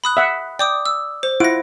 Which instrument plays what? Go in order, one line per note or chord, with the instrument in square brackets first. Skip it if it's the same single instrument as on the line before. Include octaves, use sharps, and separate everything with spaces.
[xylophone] B5 D#6 F#6
[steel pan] E5 F#5
[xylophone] D5 D6 D#6 [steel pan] G5
[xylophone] E6
C5
[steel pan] E4 F4 F#5 [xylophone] A#6 D7